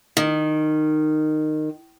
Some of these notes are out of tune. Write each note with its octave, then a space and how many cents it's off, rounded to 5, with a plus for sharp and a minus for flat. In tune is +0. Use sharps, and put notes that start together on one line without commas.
D#3 -15